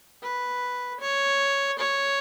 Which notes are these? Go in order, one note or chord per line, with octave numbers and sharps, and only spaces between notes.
B4
C#5
C#5